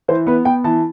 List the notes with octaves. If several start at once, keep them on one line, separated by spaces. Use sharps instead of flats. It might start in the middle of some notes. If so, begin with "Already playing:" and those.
E3 C5
B3 B4
B3 G5
E3 A5